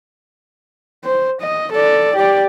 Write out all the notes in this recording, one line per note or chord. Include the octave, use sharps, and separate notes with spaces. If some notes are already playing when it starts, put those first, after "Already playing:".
C5
D#5
A4 D5
G4 D5